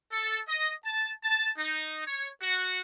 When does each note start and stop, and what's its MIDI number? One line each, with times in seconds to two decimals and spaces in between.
0.12 0.40 69
0.49 0.73 75
0.84 1.12 81
1.23 1.51 81
1.58 2.03 63
2.07 2.29 73
2.42 2.81 66